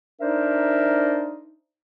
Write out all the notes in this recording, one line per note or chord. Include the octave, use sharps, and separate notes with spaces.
D4 D#4 A#4 C5 D5 E5